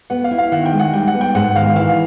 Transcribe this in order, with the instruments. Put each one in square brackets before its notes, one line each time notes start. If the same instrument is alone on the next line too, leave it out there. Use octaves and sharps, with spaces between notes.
[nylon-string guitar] B3 [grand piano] F#5
[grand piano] F5
[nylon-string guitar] E4
[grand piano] F5
[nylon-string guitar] D#3 [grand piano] F#5
[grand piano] G5
[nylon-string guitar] G#3
[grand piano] F#5
[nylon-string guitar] G3 [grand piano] G5
[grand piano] F#5
[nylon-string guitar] B3
[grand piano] G5
[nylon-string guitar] G#2 [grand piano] F#5
[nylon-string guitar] D#3 [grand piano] F5
[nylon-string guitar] E3 [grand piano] F5